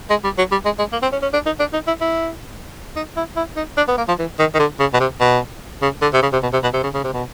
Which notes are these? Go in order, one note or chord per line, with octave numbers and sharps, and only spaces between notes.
G#3
G3
F#3
G3
G#3
G#3
A#3
C4
C#4
C#4
D4
D#4
D4
D#4
E4
E4
D#4
E4
E4
D#4
D4
B3
A#3
F3
E3
D#3
D#3
D3
C#3
B2
C3
B2
C#3
D3
C3
C#3
C3
B2
C3
B2
C3
C#3
C#3
C3
B2